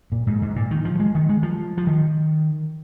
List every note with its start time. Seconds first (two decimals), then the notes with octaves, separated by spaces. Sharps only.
0.12 A#2
0.27 G#2
0.42 G#2
0.56 A#2
0.71 D#3
0.85 F3
1.00 G#3
1.15 D#3
1.29 G#3
1.43 F3
1.78 F3
1.87 D#3